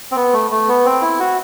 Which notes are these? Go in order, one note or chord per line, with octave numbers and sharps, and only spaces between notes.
C4
B3
A3
A3
B3
C4
E4
F#4